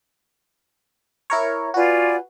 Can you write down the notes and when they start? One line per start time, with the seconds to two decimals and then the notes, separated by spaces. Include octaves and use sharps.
1.30 E4 A#4 C#5
1.74 F4 F#4 B4 D5 G#5